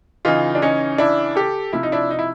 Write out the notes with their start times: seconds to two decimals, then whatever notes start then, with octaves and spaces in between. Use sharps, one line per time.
0.25 C#3 E3 D#4 F4
0.55 D4
0.62 C#4 D#4
0.98 D4 E4
1.36 G4 A4
1.73 C3 F3 E4
1.83 D#4
1.92 D4 E4
2.11 D#4
2.19 E4